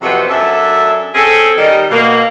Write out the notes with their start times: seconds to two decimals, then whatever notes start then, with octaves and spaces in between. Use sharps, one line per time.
0.02 F2 C3 F#3 B3 F#4 C5
0.30 F#2 D4 A4 E5
1.15 C4 C#4 G#4 A4
1.58 D#3 G3 D#4
1.91 B2 A#3